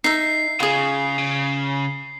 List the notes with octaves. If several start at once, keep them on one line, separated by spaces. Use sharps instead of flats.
D#4 E5 C7
C#3 F4 G#4
C#3